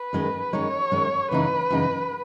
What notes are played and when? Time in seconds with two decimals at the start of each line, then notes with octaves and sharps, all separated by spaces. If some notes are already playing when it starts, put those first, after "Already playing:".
Already playing: B4
0.13 F#2 D#3 G#3 D#4
0.53 F#2 D#3 G#3 D#4 C#5
0.92 F#2 D#3 G#3 D#4
1.31 F#2 C#3 E3 G#3 D#4 B4
1.70 F#2 C#3 E3 G#3 D#4